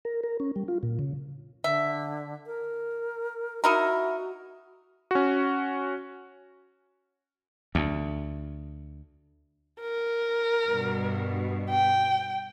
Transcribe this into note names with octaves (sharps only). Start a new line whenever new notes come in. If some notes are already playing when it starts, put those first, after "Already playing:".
A#4
A#4
C#4
G3
F4
A#2
C#3
D3 E5
A#4
D#4 E4 F#4 A#4
C#4 F#4
D2
A#4
G2 B2
G5